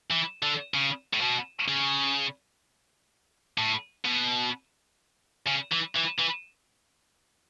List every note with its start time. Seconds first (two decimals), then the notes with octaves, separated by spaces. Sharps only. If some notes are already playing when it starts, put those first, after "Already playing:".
0.11 E3
0.42 D3
0.74 C#3
1.14 A2
1.22 B2
1.68 C#3
3.58 A2
4.05 B2
5.47 C#3
5.72 E3
5.95 E3
6.19 E3